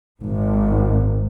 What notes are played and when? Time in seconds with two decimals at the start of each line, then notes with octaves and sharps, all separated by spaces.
0.20 G#1